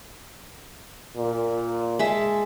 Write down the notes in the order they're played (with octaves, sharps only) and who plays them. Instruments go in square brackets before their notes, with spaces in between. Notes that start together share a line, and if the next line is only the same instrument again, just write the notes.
[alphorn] A#2
[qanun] G#3 E5 A5